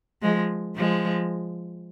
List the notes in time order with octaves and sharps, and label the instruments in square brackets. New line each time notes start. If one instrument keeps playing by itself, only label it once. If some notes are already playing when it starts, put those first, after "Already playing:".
[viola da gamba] F3 G#3
F3 G#3